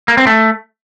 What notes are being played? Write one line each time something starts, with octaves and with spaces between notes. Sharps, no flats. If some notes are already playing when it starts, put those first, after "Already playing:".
A#3
C4
A3